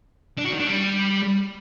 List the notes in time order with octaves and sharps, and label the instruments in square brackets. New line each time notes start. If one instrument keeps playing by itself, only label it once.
[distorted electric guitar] D4
F#4
D#3
D4
G3